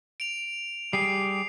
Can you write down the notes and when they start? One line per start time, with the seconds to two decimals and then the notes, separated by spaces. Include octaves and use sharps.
0.20 D7 F7
0.93 G3 G4 G#4 C7